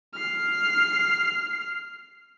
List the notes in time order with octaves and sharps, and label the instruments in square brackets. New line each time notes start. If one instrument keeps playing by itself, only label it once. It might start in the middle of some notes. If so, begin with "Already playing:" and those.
[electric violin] F6 C7